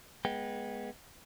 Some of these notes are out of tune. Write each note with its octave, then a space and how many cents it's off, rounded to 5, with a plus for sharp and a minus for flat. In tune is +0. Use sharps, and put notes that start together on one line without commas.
G#3 +0 B3 -20 G5 +0